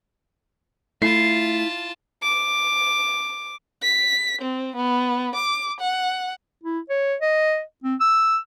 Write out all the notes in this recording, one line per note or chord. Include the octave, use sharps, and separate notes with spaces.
A3 E4 F4 A5 C7
D6
B6
C4
B3
D6
F#5
E4
C#5
D#5
C4
E6